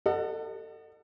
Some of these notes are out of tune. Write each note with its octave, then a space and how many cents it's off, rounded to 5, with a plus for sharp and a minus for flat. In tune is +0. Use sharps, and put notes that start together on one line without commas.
A4 +30 D#5 -30 F#5 +0